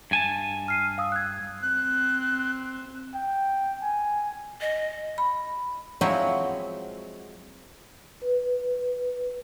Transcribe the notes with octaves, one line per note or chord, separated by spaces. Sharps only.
G2 G#5 A5
F6 C7 D#7
F5 D#6 E6
F#6 G#6
C4 F#6
G5
G#5
D#5
B5
F3 F#3 G#3 C4 E4 F#4
B4